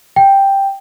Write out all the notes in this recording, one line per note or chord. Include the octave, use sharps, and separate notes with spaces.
G5